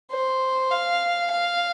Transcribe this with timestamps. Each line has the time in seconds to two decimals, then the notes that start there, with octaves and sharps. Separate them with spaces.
0.11 C5
0.71 F5
1.31 F5